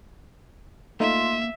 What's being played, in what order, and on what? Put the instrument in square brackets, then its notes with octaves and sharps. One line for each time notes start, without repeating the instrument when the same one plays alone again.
[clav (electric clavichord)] A3 D#4 [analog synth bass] A#3 [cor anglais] F4 [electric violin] E5